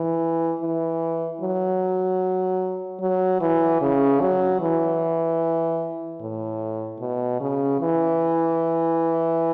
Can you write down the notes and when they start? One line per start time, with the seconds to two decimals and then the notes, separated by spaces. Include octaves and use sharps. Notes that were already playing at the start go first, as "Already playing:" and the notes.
Already playing: E3
0.61 E3
1.41 F#3
3.01 F#3
3.41 E3
3.82 C#3
4.21 F#3
4.60 E3
6.21 A2
7.00 B2
7.41 C#3
7.80 E3